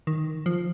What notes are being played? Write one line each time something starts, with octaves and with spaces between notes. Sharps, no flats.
D#3
F3